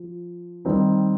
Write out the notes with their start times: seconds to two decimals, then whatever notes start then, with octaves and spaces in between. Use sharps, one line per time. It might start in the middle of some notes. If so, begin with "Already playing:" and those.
Already playing: F3
0.65 D#3 G3 C4 D#4